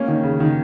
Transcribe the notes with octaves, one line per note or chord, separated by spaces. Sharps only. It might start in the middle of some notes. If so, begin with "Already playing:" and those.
Already playing: A#3 C#4
D#3
C#3
D#3